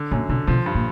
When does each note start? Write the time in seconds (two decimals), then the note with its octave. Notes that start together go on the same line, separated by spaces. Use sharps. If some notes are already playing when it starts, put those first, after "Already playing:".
Already playing: D3
0.11 F#2 A#2
0.29 B2 D3
0.47 B2 F3
0.66 G2
0.75 A#2